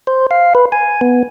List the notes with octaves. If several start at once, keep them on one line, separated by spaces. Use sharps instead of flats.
C5
F5
B4
G#5
B3